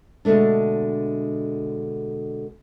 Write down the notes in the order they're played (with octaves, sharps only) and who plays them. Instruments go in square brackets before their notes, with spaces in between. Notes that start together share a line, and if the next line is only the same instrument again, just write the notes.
[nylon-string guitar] B2 D3 G#3 A3 D4